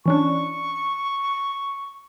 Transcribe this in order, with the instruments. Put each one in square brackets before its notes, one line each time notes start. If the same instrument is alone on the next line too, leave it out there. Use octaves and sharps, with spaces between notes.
[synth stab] E3 C#4 D4 [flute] C#6